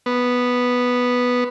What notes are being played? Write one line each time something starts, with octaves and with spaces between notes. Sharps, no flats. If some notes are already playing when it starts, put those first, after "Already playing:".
B3